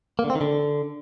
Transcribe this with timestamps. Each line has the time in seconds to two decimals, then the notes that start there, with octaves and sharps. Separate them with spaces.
0.19 A#3
0.24 D3
0.30 C4
0.35 D#3
0.41 D3